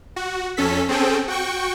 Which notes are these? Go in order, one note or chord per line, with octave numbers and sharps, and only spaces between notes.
F#4
F2 C#4 A4 B6
C4 C#4 G#4 A4 G5
F#4 G5 C#6